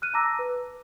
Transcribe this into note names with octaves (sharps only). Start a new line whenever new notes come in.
F6 F#6 D#7
A5 A#5 D6 E6 A#6
B4